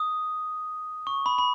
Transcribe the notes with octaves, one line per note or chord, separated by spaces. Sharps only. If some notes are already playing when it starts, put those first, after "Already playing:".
Already playing: D#6
C#6
B5
B5